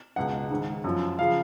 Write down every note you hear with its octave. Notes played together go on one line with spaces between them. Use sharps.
C#2 B2 F#5
G#2 D#3
F#2 F3
C#3 F3 F5